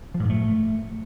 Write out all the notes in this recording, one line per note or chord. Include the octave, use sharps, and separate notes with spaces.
F3
A2
G#2
A3